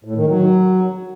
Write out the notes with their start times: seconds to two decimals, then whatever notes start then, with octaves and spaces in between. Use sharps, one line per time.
0.04 A2
0.16 D#3
0.28 F#3